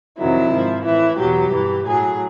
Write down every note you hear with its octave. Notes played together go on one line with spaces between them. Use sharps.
F2 C3 D#3 F#3 E4
G#2 F3
A2 E3 E4
E2 B2 F#3 G4
G2 E3
A2 F#3 G#4